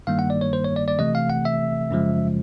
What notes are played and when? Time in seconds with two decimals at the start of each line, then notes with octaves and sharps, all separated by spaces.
0.07 G2 D#3 G3 A#3 F5
0.19 F#5
0.30 D5
0.41 C#5
0.53 C5
0.64 C#5
0.76 D5
0.88 D5
0.99 C3 E3 A3 D#5
1.15 F5
1.30 F#5
1.45 E5
1.91 F#2 C#3 F3 G#3